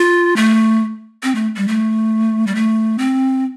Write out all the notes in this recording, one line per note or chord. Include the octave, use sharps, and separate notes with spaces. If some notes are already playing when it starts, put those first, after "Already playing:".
Already playing: F4
A3
C4
A3
G3
A3
G3
A3
C4